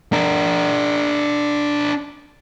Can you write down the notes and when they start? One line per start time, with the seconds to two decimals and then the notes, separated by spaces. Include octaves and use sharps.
0.13 D4 A#4